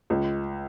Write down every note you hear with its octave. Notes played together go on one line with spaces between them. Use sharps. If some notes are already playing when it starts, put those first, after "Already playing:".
C#2